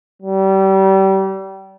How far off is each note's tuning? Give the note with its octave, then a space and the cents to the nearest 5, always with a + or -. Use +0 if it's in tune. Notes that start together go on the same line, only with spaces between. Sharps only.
G3 -30